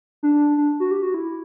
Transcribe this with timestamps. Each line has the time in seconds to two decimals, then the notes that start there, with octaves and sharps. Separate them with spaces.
0.23 D4
0.57 D4
0.80 F#4
0.91 G4
1.02 F#4
1.14 E4